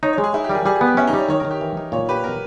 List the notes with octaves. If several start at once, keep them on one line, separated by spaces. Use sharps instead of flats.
D#4 C#5
C#5
G#3
G#4
D#4 E4
G4
G3 A#4
G#4
G3 G#4
G#4
B3
G4
C#4 E4
D#4
G3 C#5
D#3 C#5
A#4
D#3
G4
E3
D#4
A#2 C#5
G4 B4
B2 A#4